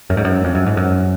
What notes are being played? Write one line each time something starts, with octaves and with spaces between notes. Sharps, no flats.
F#2
G#2
F#2
F2
F#2
G#2
F#2